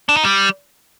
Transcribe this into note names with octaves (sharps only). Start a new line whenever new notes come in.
D4
D#4
G3